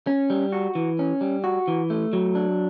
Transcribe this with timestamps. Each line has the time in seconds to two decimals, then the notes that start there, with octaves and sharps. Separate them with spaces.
0.07 C#4
0.30 G3
0.52 F#4
0.75 E3
0.99 C#4
1.21 G3
1.44 F#4
1.68 E3
1.90 A3
2.13 F#3
2.35 D4